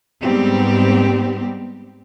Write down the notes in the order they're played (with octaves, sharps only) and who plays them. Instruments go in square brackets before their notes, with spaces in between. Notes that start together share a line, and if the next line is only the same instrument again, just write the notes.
[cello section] G#2 G3 B3 C4 G4